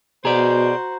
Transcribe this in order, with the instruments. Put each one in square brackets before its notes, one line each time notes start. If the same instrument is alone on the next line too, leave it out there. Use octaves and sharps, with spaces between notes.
[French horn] B2 [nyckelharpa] F#4 C5 [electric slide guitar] G#4 D5 [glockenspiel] A#5